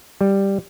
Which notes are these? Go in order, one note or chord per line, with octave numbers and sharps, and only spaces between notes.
G3